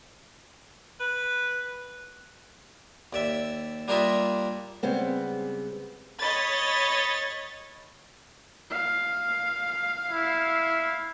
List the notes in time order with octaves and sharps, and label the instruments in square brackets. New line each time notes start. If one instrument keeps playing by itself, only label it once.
[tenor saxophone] B4
[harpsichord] D#2 D5 E5
G3 A#3 D4 F4 D#5 E5
[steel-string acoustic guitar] C#3 G3 G#3 B3 C4
[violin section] C#5 D#5 B5 A6
[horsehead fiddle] F5
[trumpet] E4